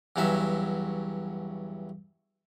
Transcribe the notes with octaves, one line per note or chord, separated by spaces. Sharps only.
E2 G2 F#3 C#4 E5